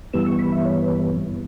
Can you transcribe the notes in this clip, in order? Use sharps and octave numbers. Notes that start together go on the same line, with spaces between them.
G2 E3 G3 B3 E6
C#6
B5
E5
C#5
B4